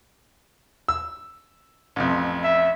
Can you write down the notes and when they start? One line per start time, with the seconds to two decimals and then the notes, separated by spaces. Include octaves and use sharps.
0.88 E6
1.96 A1 F2
2.44 E5